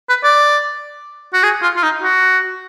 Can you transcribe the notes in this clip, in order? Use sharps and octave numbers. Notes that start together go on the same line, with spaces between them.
B4
D5
F#4
G#4
F4
F4
D#4
F#4